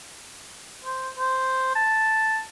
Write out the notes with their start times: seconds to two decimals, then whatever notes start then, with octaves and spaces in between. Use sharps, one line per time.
0.84 C5
1.18 C5
1.75 A5